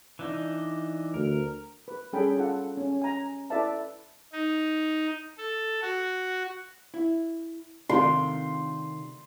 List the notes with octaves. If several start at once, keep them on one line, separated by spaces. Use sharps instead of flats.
E3 D4 D#4
D2 A#4
B4
G3 C#4 G#4 A4 G5 B5
F4 A4 F#5
C#4
G#5 A#5
E4 A4 B4 D5 E5 A5
D#4
A4
F#4
E4
C3 D#3 F4 C6